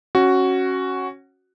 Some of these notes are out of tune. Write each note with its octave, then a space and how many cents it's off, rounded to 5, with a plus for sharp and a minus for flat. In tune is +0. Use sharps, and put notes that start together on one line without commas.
C#4 -15 F#4 +5